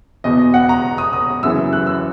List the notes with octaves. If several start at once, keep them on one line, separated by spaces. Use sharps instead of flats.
E2 B2 D#5
F#5
A#5
D#6
D#6
F#2 C#3 E3 E6
F#6
E6